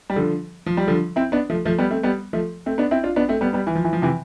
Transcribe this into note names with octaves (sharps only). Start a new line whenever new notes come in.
G3
D3 F3
F3
G3
D3 F3
C4 E4
B3 D4
F3 A3
F3 A3
G3 B3
A3 C4
G3 B3
F3 A3
A3 C4
B3 D4
C4 E4
D4 F4
B3 D4
A3 C4
G3 B3
G3 B3
E3
F3
E3
F3
C3 E3